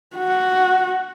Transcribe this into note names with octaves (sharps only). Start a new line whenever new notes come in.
F#4